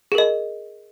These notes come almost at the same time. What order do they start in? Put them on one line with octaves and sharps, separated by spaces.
G#4 A#4 D#5